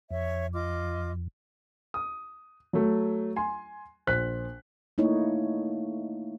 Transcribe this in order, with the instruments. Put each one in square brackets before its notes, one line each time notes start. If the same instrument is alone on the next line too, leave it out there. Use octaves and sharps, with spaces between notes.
[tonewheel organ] F2 [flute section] C#5 E5
[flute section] F4 D#5 D6
[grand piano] D#6
F#3 A3
G#5 C6
A#1 C5 F#6 B6
[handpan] A3 A#3 D#4 E4 C#5